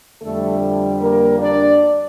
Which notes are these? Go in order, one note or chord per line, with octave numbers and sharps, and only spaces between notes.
F2 D3 G3 A3 A4
A#3 A#4
D4 D5